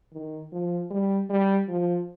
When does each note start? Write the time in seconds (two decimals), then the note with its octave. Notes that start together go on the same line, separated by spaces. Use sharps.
0.13 D#3
0.52 F3
0.91 G3
1.30 G3
1.69 F3